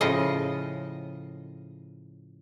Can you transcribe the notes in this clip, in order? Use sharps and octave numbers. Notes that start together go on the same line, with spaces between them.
A2 C#3 F3 F4 D#5